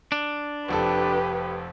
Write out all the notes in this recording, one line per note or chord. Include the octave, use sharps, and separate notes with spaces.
D4
F1 F2 G4 A4 B4